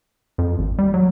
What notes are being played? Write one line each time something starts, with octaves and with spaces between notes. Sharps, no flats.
F2
G#1
G3
F#3